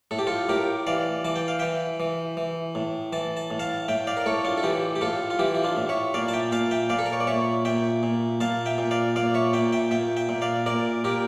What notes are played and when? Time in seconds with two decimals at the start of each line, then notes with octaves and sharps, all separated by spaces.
0.11 A2 A4
0.19 G4
0.27 F4 A4
0.49 A2 G4 A#4
0.87 E3 D5 F5
1.24 E3 A5
1.36 G5
1.48 F5
1.59 E3 E5 G5
2.00 E3
2.37 E3
2.75 A2
3.13 E3 A5
3.37 A5
3.51 A2
3.59 F5 A5
3.88 A2 E5 G5
4.07 D5 F5
4.17 A#4
4.26 A2 A4 C#5
4.45 D4 F4
4.57 A4
4.63 E3 E4 G4
4.96 G4
5.01 A2 F4 A4
5.30 F4
5.39 E3 E4 G4
5.55 E4
5.64 D4 F4
5.77 A2
5.89 C#5 E5
6.14 A#2 D5 F5
6.28 A5
6.33 E5 G5
6.52 A#2 F5 A5
6.71 E5 G5
6.90 A#2 D5 F5
6.99 A4
7.06 A#4
7.13 C#5
7.20 D5
7.27 A#2 C#5 E5
7.65 A#2 E5 G5
8.03 A#2
8.41 A#2 F5 A5
8.66 E5 G5
8.78 A#2
8.91 D5 F5
9.16 A#2 D5 F5
9.34 C#5 E5
9.53 A#2 E5 G5
9.72 E5 G5
9.91 A#2 E5 G5
10.17 E5 G5
10.29 A#2
10.42 D5 F5
10.66 A#2 A#4 D5
11.04 A#2 G4 A#4